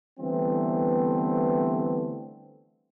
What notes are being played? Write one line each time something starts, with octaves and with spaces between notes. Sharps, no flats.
D3 E3 G3 A3 B3 C4